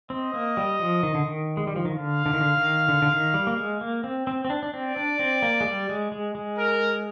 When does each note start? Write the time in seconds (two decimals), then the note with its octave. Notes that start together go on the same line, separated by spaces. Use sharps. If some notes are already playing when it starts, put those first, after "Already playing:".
0.10 C4 D#5
0.34 A#3
0.57 G3
0.80 F3
1.03 D#3
1.15 D3
1.25 D#3
1.57 G#3
1.67 G3
1.76 F3
1.85 D#3
1.95 D3 F5
2.26 D3
2.34 D#3
2.41 D3
2.57 D#3
2.89 D3
3.02 D3
3.12 D#3
3.34 G3
3.47 A#3
3.57 G#3
3.81 A#3
4.04 C4
4.27 C4
4.45 C4
4.50 D4
4.63 D4
4.73 C4 D5
4.97 D4
5.19 C4
5.42 A#3
5.61 G#3
5.66 G3
5.89 G#3
6.12 G#3
6.35 G#3
6.58 A#4